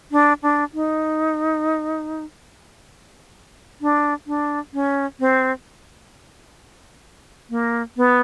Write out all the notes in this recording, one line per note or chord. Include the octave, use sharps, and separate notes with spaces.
D4
D4
D#4
D4
D4
C#4
C4
A#3
B3